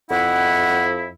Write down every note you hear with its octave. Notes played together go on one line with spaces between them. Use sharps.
F2 E4 F#5